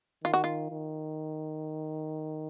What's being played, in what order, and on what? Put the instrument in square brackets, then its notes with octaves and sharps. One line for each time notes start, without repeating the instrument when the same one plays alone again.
[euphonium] D#3 [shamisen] F4
[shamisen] F#4
F4
[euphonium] D#3